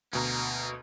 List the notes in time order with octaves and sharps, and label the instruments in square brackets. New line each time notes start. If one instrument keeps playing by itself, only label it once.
[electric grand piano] D2 B2 A#5 [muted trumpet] A#3